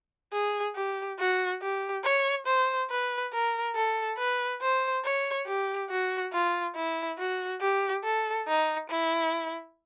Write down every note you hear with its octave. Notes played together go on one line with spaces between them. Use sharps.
G#4
G4
F#4
G4
C#5
C5
B4
A#4
A4
B4
C5
C#5
G4
F#4
F4
E4
F#4
G4
A4
D#4
E4